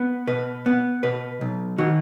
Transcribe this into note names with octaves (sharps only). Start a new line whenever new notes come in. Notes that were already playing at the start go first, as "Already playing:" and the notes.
Already playing: B3
B2 B4
B3
B2 B4
B1
D#3 F#4